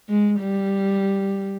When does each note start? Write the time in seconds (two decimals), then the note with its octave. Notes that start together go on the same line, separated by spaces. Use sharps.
0.09 G#3
0.40 G3